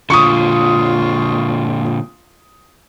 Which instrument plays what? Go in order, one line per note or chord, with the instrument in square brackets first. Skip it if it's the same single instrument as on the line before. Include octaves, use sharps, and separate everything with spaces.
[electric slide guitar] A#2 D3 [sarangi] F4 [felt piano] C#6 D#6